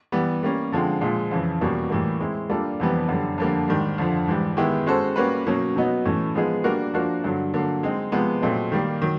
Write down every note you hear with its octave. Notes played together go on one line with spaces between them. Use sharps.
E3 G3 B3
G3 A#3 C#4
D3 F3 G#3 C4
A#2 F3 G#3
F2 C#3 E3
E2 B2 G3 A#3 C#4
A2 E3 G3 A#3
G#3 C4 E4
G3 A#3 D4 F4 A4
F2 C3 E3 G3 B3
F#2 D3 G3
F2 D3 G3 A#3
G#2 D#3 G3
F2 D3 F3
G#2 E3 G3
D#3 G#3 B3 E4 G4
G#3 C#4 F#4 A4 C5
G3 A#3 C#4 F#4 B4
B2 F#3 A#3 C#4
B2 F#3 B3 D#4
A2 E3 A3 C#4
F3 G#3 B3 D#4 G#4
G3 A#3 D4 F#4 A#4
F3 A#3 D4 F#4 A#4
G2 D3 F#3
D3 F#3 A#3
G#3 C4 D#4
C3 F3 G#3 B3
A#2 F#3 A3 C4 D#4
D#3 G3 A#3
D#3 F#3